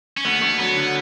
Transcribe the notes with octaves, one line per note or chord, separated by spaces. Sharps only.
C#4
D2 B3
D2
F#3 B3
D3